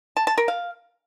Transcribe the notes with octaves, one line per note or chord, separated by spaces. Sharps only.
A5
A5
A#4
F5